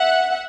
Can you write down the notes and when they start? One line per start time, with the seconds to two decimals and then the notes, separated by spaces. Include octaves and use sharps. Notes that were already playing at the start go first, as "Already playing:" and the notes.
Already playing: E5 F#5